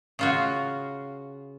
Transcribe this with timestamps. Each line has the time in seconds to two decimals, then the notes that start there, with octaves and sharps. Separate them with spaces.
0.19 C#3 F4 F#4